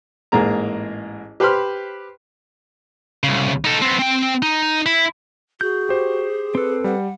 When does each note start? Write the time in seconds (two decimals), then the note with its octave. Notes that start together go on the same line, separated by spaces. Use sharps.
0.32 A1 G#2 A#3 G#4 A#5
1.40 G4 B4 C5 B5 C6 F6
3.23 C2 C#3
3.64 D#4 A4
3.82 B3 C4
3.99 C4 G5
4.42 D#4
4.86 E4
5.61 F#4 G#4 G6
5.89 G4 C5
6.55 C4 A4 B4
6.84 G3 F#5